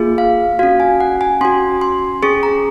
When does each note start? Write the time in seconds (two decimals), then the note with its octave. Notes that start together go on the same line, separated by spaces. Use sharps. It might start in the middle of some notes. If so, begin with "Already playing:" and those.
Already playing: A#3 F4 G#4
0.18 F5
0.59 C#4 F#4 F5
0.80 G#5
1.00 F#5
1.21 G#5
1.41 C#4 F#4 C6
1.81 C6
2.23 C#4 G#4 C#6
2.43 A#5